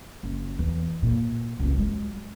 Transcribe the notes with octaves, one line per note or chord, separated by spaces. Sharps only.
F#1
E2
A#2
C#2 B3
F#3 G#3